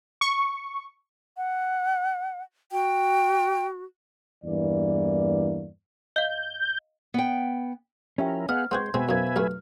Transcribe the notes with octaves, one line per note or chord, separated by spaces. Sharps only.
C#6
F#5
F#4 G5
E2 G2 E3 A#3 D5
D#5 F5 G6
B3 G5
F3 C#4 E4 G4 A#4 E5 G5
B3 G#4 D#5 F5 F#5 F6
G#3 B3 C4 F#4 C5 C6 G6 G#6
B2 G#3 C4 B4 E5 G#5
F#2 D#4 C5 F5 G#6
B1 G2 A3 F6